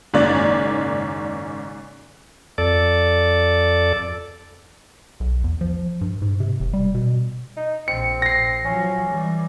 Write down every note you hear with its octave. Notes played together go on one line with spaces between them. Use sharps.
F#1 G#2 D#3 C#4 D5
F2 A4 D5
B1
E2
F3
G2
G#2
C3
F1
G3
B2
D#4
A#1 C4 C#7
A#6 C7
F3 F#3 C#4
E3 G3